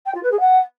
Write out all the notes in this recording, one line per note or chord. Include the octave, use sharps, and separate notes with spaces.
G5
F4
B4
G#4
F#5